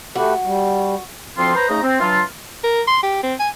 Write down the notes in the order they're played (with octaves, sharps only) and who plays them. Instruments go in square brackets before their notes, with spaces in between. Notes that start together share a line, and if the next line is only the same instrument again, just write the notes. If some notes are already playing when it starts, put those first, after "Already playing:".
[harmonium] A3 G4 B4 [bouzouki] F#4
[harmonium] G3
[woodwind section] D2 F3 C4 F4 C6
B4 C5 A#5
C#3 A3 D#4 D#5 A#5
C4
E3 F#3 D4 F4
[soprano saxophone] A#4
C6
G4
C4
G#5